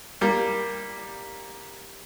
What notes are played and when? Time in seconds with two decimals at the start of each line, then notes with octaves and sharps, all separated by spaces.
0.21 G3 A#3